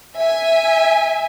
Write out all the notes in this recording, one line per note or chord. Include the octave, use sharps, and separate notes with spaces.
E5 G#5